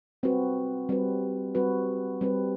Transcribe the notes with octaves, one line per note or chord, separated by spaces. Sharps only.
G3 C4 F#4 B4
G3 C4 F#4 B4
G3 C4 F#4 B4
G3 C4 F#4 B4